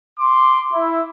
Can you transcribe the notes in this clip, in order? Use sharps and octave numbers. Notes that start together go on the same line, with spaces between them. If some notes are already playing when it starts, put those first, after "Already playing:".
C6 D6
E4